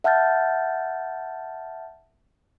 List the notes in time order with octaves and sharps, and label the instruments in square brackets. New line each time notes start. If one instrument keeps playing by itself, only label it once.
[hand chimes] E5 F#5 A5 F6 G6 A6